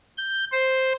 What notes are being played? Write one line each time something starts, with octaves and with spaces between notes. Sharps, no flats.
G6
C5